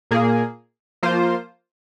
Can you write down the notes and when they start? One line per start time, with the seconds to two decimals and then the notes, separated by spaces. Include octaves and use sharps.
0.11 A#2 A#3 G#4
1.03 F3 A#3 F4 C5